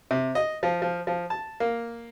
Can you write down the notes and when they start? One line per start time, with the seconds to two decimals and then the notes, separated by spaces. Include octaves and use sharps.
0.11 C3
0.35 D#5
0.63 F3
0.82 F3
1.07 F3
1.30 A5
1.60 A#3